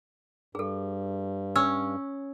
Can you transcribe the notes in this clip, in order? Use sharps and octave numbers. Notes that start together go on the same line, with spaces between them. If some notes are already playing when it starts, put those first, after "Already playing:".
G2 G#4 A4
C#4 E6